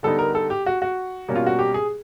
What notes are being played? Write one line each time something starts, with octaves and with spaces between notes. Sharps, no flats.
D3 G3 B3 D#4 A4
A#4
A4
G4
F#4
F#4
B2 G3 A#3 C#4
F4
F#4
G4
G#4